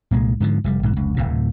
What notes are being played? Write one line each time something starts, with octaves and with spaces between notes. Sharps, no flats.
C2 A#2 F#3 G#3
G#2 D3 D#3 F3
F1 C3 G3
A#1 G#2 B2
F1 C#2
D1 A#1 A2 C3